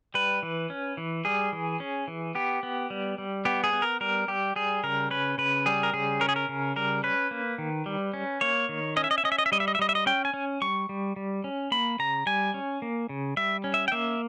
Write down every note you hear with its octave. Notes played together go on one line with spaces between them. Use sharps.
G3 B4
E3
C#4
E3
G3 G#4
E3
C#4
E3
B3 G4
B3
G3
G3
B3 G4
G#4
B3
A#4
G3 A#4
G3 G4
G3 G#4
C#3 A#4
C#4 B4
C#3 B4
G3 G#4
A#4
C#3 G#4
C#4 A#4
G#4
A#4
C#3
G3 A#4
C#4 B4
A#3
D#3
G3
C#4
A#3 C#5
D#3
C#4 D#5
E5
D#5
E5
C#4 D#5
E5
D#5
E5
G3 D#5
E5
D#5
E5
G3 D#5
E5
D#5
C#4 G5
G#5
C#4
G3 C#6
G3
G3
C#4
A#3 B5
C#3 A#5
G3 G#5
C#4
A#3
C#3
G3 E5
C#4
E5
G5
A#3 E5